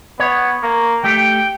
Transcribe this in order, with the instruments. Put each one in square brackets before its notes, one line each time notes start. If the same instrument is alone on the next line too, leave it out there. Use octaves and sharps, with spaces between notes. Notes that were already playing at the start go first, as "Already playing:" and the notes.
[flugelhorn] B3 [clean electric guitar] C#5
[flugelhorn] A#3
[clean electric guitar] A3 G4 [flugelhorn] G5